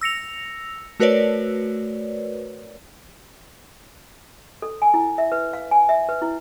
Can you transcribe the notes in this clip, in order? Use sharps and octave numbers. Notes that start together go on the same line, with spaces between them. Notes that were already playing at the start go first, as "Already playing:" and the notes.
E6 A#6 C#7 F7
A3 F#4 A#4 B4 C#5 D5
A4
G#5
E4
E5
B4
F5
G#5
E5
B4
E4